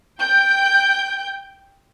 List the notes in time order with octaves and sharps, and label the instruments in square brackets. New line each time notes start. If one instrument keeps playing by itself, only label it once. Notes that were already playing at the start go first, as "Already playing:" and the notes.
[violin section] G5 G6